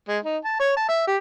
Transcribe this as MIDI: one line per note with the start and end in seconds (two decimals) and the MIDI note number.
0.08 0.18 56
0.24 0.37 63
0.44 0.55 81
0.60 0.74 73
0.76 0.84 81
0.88 1.06 76
1.07 1.17 67